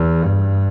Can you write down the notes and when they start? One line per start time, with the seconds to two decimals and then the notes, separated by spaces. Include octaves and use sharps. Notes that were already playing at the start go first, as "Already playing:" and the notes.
Already playing: E2
0.24 G2